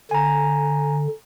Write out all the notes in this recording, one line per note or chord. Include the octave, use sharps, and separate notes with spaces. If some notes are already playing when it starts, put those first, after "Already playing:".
D3 G#5 A#5